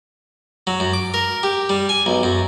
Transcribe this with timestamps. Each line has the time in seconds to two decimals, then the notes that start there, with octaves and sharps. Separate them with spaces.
0.67 F#3
0.80 F#2
0.93 D6
1.14 A#4
1.43 G4
1.69 G3
1.89 G#5
2.06 B1
2.23 F#2